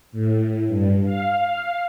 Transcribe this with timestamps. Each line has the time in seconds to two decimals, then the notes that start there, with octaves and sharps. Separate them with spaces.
0.12 A2
0.67 G2
1.05 F5